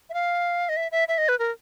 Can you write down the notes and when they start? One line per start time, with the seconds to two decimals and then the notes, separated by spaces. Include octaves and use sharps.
0.09 E5
0.14 F5
0.69 D#5
0.77 E5
0.92 E5
1.08 E5
1.18 D#5
1.28 B4
1.39 A#4